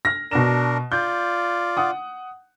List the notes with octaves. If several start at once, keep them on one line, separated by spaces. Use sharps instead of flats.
F6 A#6
B2 D4 A#4 E7
F4 D5 G6
F#5 D#6